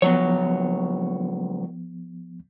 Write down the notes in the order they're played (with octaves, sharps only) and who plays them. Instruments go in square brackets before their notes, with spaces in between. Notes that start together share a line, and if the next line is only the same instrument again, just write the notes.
[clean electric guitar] C#2 F#3 C#5 [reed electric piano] F3 B3